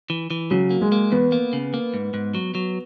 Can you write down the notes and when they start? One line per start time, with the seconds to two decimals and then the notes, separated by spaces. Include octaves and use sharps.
0.10 E3
0.31 E3
0.51 C#3 F#3
0.70 A#3
0.81 G#3
0.92 A#3
1.12 E2 B3
1.32 A#3
1.53 C#3
1.74 A#3
1.94 G#2
2.14 G#2
2.35 F#3
2.55 F#3